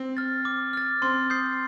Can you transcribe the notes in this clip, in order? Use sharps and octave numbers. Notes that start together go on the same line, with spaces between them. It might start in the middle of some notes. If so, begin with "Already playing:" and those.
Already playing: C4
F6 A6
D6
F6 A6
C4 C6
D#6 G6 C7